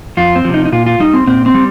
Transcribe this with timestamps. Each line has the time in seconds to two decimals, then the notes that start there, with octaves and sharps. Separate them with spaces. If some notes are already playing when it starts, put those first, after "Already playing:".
0.17 F2 F4
0.36 C4
0.45 C3 F3
0.54 D#4
0.66 D#4
0.72 A#2 F4
0.86 F4
1.00 G3 D#4
1.14 C4
1.27 A#2 C4
1.46 C4
1.54 G3